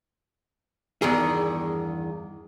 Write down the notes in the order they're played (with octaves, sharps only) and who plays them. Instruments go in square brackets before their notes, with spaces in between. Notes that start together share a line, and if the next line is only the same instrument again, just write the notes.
[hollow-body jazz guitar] E2 G2 D#3 G#4